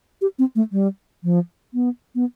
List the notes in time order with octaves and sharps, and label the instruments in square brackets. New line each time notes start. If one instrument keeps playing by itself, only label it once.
[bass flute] G4
C4
A3
G3
F3
B3
B3